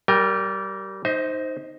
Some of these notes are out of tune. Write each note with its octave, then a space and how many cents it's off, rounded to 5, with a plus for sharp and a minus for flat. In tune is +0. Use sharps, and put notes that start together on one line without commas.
G3 -25 A#4 +0 G5 +35
D#4 +0 C5 +0 E5 -45